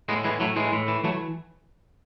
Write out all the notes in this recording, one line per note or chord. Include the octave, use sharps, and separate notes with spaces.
A2 G#3 B3
E3 G#3 B3
A2 F#3 A3
A2 E3 G#3
A2
E3
E3 F#3 A3